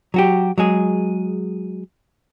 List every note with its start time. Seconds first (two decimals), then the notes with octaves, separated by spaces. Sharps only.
0.14 F#3 F#4 G4
0.58 F#3 G#3 G#4